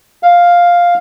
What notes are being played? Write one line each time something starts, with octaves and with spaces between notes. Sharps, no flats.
F5